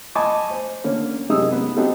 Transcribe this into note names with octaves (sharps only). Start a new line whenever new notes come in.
D#5 G#5 A5 B5 C#6 D6
C5
D3 A#3 C#4
F#2 C3 G#3 D#4 D#6 E6
B3
B3 C4 D#4 F#4 G4 A4